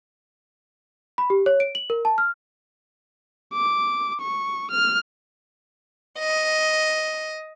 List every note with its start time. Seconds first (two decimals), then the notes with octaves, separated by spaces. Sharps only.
1.18 B5
1.30 G4
1.46 C#5
1.60 D7
1.75 F#7
1.90 A#4
2.05 A5
2.18 F6
3.53 D6
4.21 C#6
4.71 F6
6.19 D#5